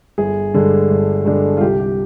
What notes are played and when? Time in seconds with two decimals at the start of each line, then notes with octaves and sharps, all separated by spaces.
0.18 G1 G#4
0.54 G2 D3 G#3 D4
0.90 G1
1.25 G2 D3 G#3 D4
1.57 F4
1.61 C2 G4
1.79 G4